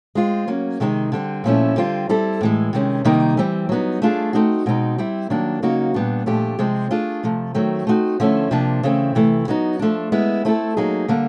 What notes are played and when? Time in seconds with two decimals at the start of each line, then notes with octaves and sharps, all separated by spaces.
0.15 G#3 C4 F4
0.47 F#3 A#3 C#4
0.80 C3 D#3 G#3 C4 D#4
1.12 D3 G3 C4
1.44 A#2 F3 A3 C#4 E4
1.76 D3 G3 C4 F4
2.09 G3 C4 E4 A4
2.41 A2 E3 G#3
2.73 C3 D#3 G#3 C#4
3.05 C3 D#3 G3 A#3 D#4
3.37 E3 G3 C4
3.69 F#3 B3 D#4
4.02 A3 D4 F4 G#4
4.33 A3 C4 D#4 F#4
4.66 B2 G#3 C4 D#4
4.98 G3 C4 E4
5.30 D#3 F#3 A#3 D4
5.62 C#3 F#3 A#3 D#4 F#4
5.94 A#2 G3 B3 D4
6.26 A#2 F3 A3 D4 G4
6.59 C3 F3 G#3 C4
6.91 A3 D4 F4 G#4
7.23 C3 F3 A3
7.54 D#3 F#3 A3 C4
7.87 A3 C4 D#4 F#4
8.20 D3 F3 A3 C#4 E4
8.51 C3 F3 A#3 D4
8.83 C#3 E3 A3 C4
9.15 C3 E3 A3
9.48 F#3 B3 D#4
9.79 F3 A3 D4
10.12 G#3 B3 E4
10.45 A3 C4 E4 A4
10.77 F#3 A#3 D#4 G#4
11.08 D3 G3 A#3 D4